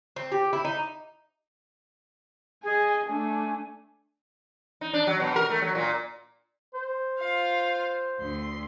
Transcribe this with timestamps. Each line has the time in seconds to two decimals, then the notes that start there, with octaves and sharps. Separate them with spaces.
0.16 C4
0.32 G4
0.53 E4
0.65 D#4
2.63 G#4 D#5 G#5
3.07 A3 D4 G#5
4.81 D#4
4.94 D4
5.07 F#3
5.20 B2
5.36 A#4
5.50 A3
5.62 F#3
5.75 A#2
6.74 C5
7.20 F4 F5
8.20 D2 C6